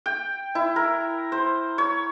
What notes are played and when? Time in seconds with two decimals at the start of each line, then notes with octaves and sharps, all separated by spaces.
0.06 G5
0.55 E4
0.76 A#4
1.32 C5
1.78 C#5